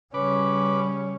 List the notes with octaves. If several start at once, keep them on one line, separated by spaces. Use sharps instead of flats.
C#3 G3 C#4 B4 D6